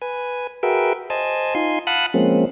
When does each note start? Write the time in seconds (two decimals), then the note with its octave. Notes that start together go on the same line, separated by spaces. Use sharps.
0.02 B4 G#5
0.63 F#4 G#4 A#4 B4 E5 G5
1.10 C5 D#5 G#5 A5
1.55 D#4 F4 G#5 C6
1.87 F5 F#5 A5 B5 D#6 F#6
2.14 F3 G#3 A#3 C4 C#4